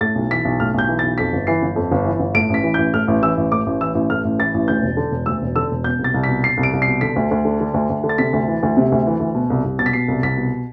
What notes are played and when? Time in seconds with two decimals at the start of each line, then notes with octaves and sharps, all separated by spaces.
0.01 A2 A6
0.15 B1
0.31 E3 B6
0.45 B1
0.60 A2 F6
0.74 B1 G6
0.88 E3
0.99 A6
1.03 B1
1.18 F2 B6
1.33 G1
1.47 E3 C7
1.62 G1
1.76 F2
1.92 G1
2.05 E3
2.20 G1
2.35 A2 D7
2.50 A1 B6
2.64 E3
2.74 G6
2.78 A1
2.94 A2 F6
3.08 A1
3.23 E3 E6
3.37 A1
3.52 A2 D6
3.66 A1
3.81 E3 E6
3.95 A1
4.10 A2 F6
4.25 A1
4.39 E3 A6
4.54 A1
4.68 D2 G6
4.82 E1
4.97 D3
5.11 E1
5.26 D2 E6
5.42 E1
5.56 D3 E6
5.71 E1
5.84 B2 G6
5.99 C2
6.04 A6
6.14 C2
6.23 B6
6.28 B2
6.43 B2 C7
6.57 C2
6.63 D7
6.73 C2
6.82 C7
6.87 B2
7.01 D3 B6
7.16 D2
7.31 D2
7.45 D3
7.61 D3
7.74 D2
7.90 D2
8.04 D3
8.09 A6
8.18 C3 B6
8.33 D2
8.48 E3
8.63 D2
8.77 C3
8.92 D2
9.07 E3
9.20 D2
9.35 B2
9.50 C2
9.64 C2
9.79 B2 A6
9.86 B6
9.93 B2 C7
10.08 C2
10.23 C2 B6
10.37 B2